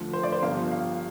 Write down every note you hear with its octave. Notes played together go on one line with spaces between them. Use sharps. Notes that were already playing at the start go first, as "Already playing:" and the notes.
Already playing: D2 D3 F3
C5
D5
C5
G1 G2 F3 F5
F5